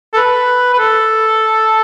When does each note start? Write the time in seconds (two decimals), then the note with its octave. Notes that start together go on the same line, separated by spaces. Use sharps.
0.13 A4
0.17 B4
0.74 B4
0.79 A4